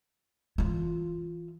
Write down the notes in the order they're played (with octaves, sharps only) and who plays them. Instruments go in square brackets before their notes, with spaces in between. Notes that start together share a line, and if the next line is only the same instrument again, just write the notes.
[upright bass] E3 F4